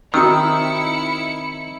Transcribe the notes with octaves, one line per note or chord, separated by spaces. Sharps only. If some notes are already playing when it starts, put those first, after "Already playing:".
D#3 C4 D#4 E4 F#4 D#6 E6 C#7